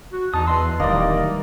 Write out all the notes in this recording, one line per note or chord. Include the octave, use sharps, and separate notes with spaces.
F#4
E2 D#4 A5 D#6
E2 B4 D#5 C6 E6
D1 D#3 E3 G3 A#3 D5 D#5